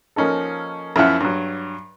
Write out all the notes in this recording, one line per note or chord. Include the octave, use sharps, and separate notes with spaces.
F3 A#3 C#4 D#4 A4
F#2 F3 E4 E5 F#5 F6
G2 F#3